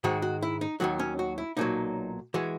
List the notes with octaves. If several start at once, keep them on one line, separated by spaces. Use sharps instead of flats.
G#2 D#3 G#3 F#4
F#4
E4
D#4
D#2 D#3 F#3 F#4
C#4
F#4
E4
B1 A#2 F#3 D#4
E3 G#3 F#4